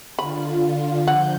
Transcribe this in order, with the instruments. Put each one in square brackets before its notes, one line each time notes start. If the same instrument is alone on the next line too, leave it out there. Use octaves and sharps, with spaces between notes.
[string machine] D3 F4 [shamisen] B5
[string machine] F3 G6 [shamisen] F#5